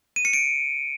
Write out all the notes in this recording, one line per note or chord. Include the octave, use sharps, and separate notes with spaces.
D#7
C#7
D7